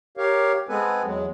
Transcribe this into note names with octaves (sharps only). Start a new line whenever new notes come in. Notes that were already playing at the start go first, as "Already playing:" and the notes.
G4 A#4 C#5 F5
G#3 B3 C4 A4 B4 G#5
E2 F#3 G#3